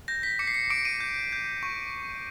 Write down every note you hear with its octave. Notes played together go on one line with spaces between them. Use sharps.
G6 A#6
B6
D6 C#7
C7
C#7
D6 D7
D#7
G6
G6
C#6